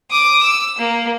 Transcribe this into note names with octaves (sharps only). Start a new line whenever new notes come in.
D6 D#6
E6
A#3